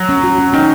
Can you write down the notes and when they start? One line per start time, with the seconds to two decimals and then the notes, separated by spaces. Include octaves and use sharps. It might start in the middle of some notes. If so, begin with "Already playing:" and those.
Already playing: F#3
0.09 C#4
0.23 F#4
0.38 C#4
0.53 D#3 C#4